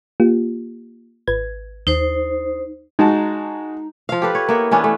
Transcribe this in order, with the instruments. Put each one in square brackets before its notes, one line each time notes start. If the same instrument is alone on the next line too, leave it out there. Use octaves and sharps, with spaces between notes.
[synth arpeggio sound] A#3 F4 G4
G#1 B4 G#6
[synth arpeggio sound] D#2 [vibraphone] D#4 C5
[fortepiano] G#3 F#4 A5 [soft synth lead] D#4
[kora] F3 F5
G4 A4 B4
C#5
A#3 B3 E4
E3 B3 C#4 D4
A3